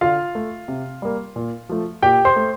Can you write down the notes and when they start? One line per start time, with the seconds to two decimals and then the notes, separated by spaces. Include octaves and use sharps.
0.01 D3 F4 F5
0.35 A3
0.68 C3
1.02 G3 A#3
1.36 A#2
1.69 F3 A3
2.02 A#2 G4 G5
2.25 C5 C6
2.36 A3